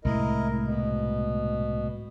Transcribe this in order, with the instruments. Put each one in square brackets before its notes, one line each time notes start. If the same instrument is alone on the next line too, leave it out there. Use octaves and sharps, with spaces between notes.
[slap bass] C2 A2 G#3 [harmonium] E4 A#4 D#5
[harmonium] B2